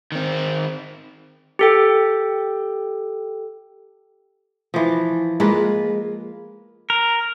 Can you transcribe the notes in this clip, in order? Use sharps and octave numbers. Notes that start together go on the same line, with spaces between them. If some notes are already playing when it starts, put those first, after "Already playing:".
D#3 C4
G4 A4 G5
E3 F3
G#3 A#3 F4 B4
A#4